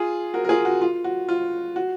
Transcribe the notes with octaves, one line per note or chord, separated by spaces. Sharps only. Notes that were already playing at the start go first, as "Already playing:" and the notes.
Already playing: F4 G#4
F#4 A#4
A#4
F4 G#4
F#4
F4
F#4
F4
F#4